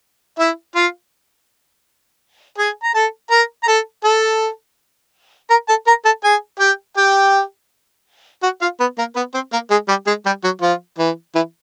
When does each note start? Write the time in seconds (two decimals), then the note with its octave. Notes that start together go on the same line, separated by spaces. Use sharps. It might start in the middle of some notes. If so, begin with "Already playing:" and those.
0.39 E4 E5
0.75 F4 F5
2.58 G#4 G#5
2.83 A#5
2.94 A4 A5
3.31 A#4 A#5
3.63 A#5
3.68 A4 A5
4.04 A4 A5
5.50 A#4 A#5
5.68 A4 A5
5.87 A#4 A#5
6.05 A4 A5
6.24 G#4 G#5
6.59 G4 G5
6.97 G4 G5
8.43 F#4 F#5
8.61 F4 F5
8.80 B3 B4
8.98 A#3 A#4
9.15 B3 B4
9.34 C4 C5
9.52 A#3 A#4
9.70 G#3 G#4
9.88 G3 G4
10.07 G#3 G#4
10.26 G3 G4
10.44 F#3 F#4
10.62 F3 F4
10.98 E3 E4
11.35 E3 E4